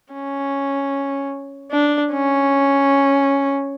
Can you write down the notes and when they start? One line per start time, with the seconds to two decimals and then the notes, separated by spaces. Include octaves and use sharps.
0.13 C#4
1.72 D4
2.13 C#4